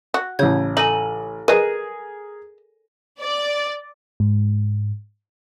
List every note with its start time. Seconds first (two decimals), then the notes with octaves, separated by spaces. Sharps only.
0.14 F#4
0.39 A1 C#3 C#5 G6 G#6
0.77 D#4 A4 G#5
1.48 G#4 A#4 B4 D#5 D#7
3.20 D5
4.20 G#2